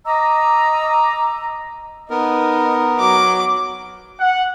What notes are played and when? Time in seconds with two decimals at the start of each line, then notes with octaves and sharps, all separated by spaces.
0.05 D#5 A#5 D6 E6
2.10 B3 D#4 A#4
2.99 F#3 D6
4.20 F#5